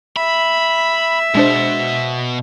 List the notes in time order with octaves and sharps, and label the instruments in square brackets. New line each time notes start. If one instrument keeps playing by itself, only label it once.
[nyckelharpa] E5 [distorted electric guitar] B5
[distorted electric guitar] B2 [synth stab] G#3 D4 C5